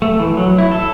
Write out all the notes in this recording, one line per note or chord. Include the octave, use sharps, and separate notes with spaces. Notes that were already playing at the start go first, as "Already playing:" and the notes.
A3
E3
F#3
E4
A4